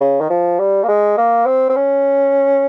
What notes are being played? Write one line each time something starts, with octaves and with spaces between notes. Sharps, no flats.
C#3
D#3
F3
G3
A#3
G#3
A#3
C4
C4
C#4